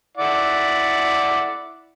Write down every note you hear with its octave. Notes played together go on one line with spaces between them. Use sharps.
E4 D5 F#5